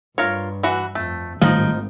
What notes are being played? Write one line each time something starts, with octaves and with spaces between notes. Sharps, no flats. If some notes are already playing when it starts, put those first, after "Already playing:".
G2 F4 A#4 C#5
E3 F#4
F2 A3
G#1 A2 D#3 F3 G3 D#4